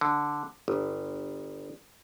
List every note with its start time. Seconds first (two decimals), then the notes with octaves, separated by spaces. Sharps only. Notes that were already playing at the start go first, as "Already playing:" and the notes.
0.01 D3
0.68 G1